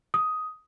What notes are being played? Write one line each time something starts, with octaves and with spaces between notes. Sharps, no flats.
D#6